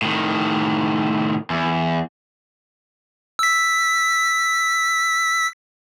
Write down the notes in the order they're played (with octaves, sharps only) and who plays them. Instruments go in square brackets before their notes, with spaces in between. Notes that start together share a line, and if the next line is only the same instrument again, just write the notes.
[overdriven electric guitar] A2 D#3
E2
[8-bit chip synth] E6 B6